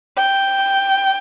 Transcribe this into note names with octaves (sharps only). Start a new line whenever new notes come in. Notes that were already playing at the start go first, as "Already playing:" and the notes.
G5